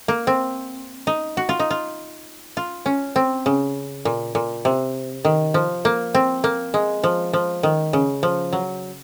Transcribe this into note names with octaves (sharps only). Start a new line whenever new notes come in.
A#3
C4
D#4
F#4
F4
D#4
F4
F4
C#4
C4
C#3
A#2
A#2
C3
D#3
F3
A#3
C4
A#3
G#3
F3
F3
D#3
C#3
F3
F#3